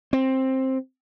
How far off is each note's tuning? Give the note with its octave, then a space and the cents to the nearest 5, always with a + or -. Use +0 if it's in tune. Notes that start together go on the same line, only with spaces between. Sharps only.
C4 +10